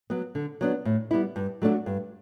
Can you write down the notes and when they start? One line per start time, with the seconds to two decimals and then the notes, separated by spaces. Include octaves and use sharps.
0.10 F#3 B3
0.35 D3
0.61 F#3 B3 D4
0.85 A2
1.11 G3 B3 E4
1.36 G2
1.62 F#3 A3 D4 F#4
1.86 G2